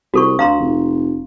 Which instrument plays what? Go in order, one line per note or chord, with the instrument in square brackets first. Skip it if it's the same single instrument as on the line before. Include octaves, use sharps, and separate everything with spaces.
[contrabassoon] C2 [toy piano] F#4 A4 C#6
[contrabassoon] D2 [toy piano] F5 A#5 C6
[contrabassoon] F1